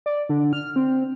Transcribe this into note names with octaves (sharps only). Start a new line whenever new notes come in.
D5
D3
F6
C4